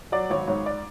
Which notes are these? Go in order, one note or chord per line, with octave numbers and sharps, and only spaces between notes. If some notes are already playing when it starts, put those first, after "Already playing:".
F#3 D5
G#1 C#5
G#2 C#5
D5